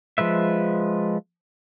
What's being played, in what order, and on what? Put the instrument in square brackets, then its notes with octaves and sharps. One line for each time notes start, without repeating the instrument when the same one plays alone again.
[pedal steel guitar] F3 G#3 B4 E5